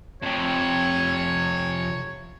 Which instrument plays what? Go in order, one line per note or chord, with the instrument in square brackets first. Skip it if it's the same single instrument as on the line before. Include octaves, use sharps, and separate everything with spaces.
[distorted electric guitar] F2 C3 [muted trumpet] C#5